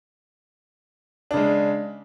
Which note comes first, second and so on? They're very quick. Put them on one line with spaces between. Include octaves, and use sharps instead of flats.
D4 C#3 G#3